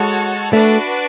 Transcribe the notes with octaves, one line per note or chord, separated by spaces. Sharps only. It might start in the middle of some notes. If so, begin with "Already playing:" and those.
Already playing: G#3 F#4 A4 C#5 F#5 A5
A3 D4 F#4 B4 D5